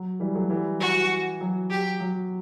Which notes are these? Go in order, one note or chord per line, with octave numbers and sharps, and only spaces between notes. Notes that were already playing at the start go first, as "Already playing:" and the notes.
Already playing: F#3
E3 G3
F#3 A3
E3 G3
E3 F#4
F#3
G4
F#3